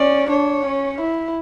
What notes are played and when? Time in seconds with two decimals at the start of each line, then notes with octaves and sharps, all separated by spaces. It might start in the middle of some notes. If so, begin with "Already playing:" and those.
Already playing: C#4 D5
0.30 D4 C#5
0.66 C#4
1.01 E4